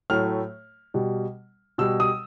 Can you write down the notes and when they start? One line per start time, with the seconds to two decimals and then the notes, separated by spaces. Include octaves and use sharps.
0.10 A2 F#3 A3 F6
0.94 B2 G3
1.78 B2 G3 E6
2.00 D#6